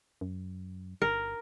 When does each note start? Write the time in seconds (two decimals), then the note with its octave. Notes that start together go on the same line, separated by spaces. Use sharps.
0.21 F#2
1.02 G1 A#4